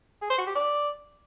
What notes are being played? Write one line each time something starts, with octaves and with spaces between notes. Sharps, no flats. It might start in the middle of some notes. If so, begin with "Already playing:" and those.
G#4
C5
F#4
G4
D5